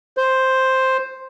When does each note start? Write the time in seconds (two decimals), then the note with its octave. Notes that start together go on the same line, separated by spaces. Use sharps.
0.17 C5